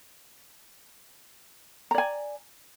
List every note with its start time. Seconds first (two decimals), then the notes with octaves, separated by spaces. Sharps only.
1.91 A#5
1.95 D5
1.98 G#5